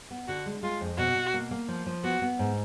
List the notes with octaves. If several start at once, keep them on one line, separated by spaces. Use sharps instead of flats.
B3
D3 F#4
G#3
G#3 F4
F2
B2 F#4
B2
A#3
A#3
F3
F3
B3 F#4
B3
G#2